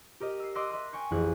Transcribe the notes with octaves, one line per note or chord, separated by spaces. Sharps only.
G4 A#4 D#5
E6 C7
D#5 C6 D6 E6 F#6 A#6
E5 C6 E6 F#6
G5 G#5 C#6 G6
A1 F2 A2 G#4 F#6